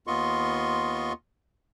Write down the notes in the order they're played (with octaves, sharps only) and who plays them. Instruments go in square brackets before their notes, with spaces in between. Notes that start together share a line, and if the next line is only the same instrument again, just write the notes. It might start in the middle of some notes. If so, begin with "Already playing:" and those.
[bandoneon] D#2 B3 F4 D#5 C6 C#6